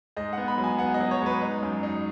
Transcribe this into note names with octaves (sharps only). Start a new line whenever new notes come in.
G#2 D#5
B3 F#5
B5
F#3
G#5
B3 F#5
D#5
F#3
C#5
G#2 B4
D#4
F#2
D#4